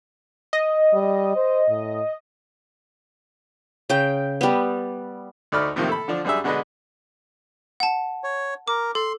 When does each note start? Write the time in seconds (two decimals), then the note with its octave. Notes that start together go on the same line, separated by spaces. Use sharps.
0.53 D#5
0.93 G3
1.36 C5
1.69 A2
3.89 C#3 G5
4.41 G3 B3
5.52 D2 A3 D#4 D5 B5 F6
5.76 A2 C3 D#3 F3 A#3
5.89 A4 B5
6.08 D3 F3 D4
6.25 F#2 G3 D4 G#4 E5
6.44 B2 D3 G#3 D4 B4 D#5
7.80 F#5 A5
8.24 C#5
8.68 A#4 D6
8.95 A4 C6